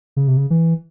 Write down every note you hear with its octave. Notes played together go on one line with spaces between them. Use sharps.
C#3
C3
C#3
E3